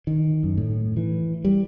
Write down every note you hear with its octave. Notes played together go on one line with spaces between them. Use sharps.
D#3
F#2
A2
E3
G3